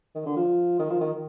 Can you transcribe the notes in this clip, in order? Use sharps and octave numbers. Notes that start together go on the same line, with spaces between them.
D#3
D3
F3
D#3
F3
D#3